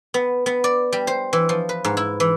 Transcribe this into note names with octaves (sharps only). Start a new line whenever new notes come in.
B3
B3
D5
G3
C5
E3
F3
B4
G#2
E4
E3